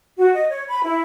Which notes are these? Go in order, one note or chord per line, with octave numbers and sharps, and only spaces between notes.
F#4
D#5
C#5
B5
E4